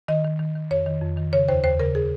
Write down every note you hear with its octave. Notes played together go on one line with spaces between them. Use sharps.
D#3 D#5
D#3
D#3
D#3
F2 C#5
D#3
F2
D#3
C#3 C#5
D#2 C5
D#2 C5
C#3 A#4
G#4